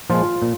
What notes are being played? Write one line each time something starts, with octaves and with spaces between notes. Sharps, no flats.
A#2 F3 G#3 F4
A#2